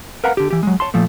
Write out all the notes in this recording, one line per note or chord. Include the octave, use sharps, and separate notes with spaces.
A#4 B4 F5 F#5 A#5
D3 G4
E3 G4
F#3 G#3
C#5 A5 C6
A#2 F3 A3